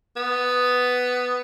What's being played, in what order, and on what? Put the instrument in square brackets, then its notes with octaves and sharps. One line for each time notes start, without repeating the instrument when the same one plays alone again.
[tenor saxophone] B3